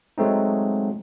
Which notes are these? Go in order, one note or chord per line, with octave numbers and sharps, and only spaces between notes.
F#3 G#3 A3 C4 D#4